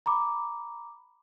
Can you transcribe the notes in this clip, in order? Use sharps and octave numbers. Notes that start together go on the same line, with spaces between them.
A#5 B5 D6